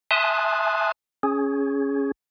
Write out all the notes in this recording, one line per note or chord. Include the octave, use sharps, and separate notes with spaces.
E5 G#5 A5 C6 D#6 F#6
C#4 G#4